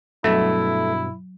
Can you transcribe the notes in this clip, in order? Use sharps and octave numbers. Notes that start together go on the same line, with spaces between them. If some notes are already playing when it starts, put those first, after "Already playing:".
G2 B2 F#3 A3 E4